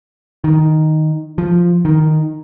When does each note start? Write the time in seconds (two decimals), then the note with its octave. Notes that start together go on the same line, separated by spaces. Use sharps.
0.44 D#3
1.38 F3
1.85 D#3